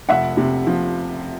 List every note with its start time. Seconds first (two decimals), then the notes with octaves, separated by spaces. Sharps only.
0.09 F1 E5 F#5
0.37 C3
0.67 F3